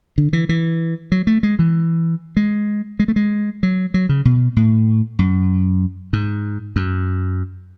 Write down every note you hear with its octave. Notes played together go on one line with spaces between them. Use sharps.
D3
E3
E3
F#3
A3
G#3
E3
G#3
G#3
A3
G#3
F#3
F#3
C#3
B2
A2
F#2
G#2
F#2